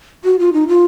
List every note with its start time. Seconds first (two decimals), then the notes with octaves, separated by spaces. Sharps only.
0.24 F#4
0.39 F4
0.53 D#4
0.68 F4